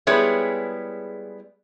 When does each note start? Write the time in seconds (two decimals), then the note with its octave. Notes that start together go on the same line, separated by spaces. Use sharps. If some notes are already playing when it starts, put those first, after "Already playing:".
0.07 G3 G#3 B3 E4 G#4 C#5